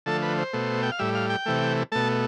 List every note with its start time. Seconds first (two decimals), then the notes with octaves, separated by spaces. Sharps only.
0.06 D3 F3 A3 A4
0.22 B4
0.38 C5
0.53 B2 A3
0.83 G5
0.92 F5
0.99 A2 G3 E5
1.15 F5
1.30 G5
1.46 C3 E3 A3
1.92 B2 A3 A5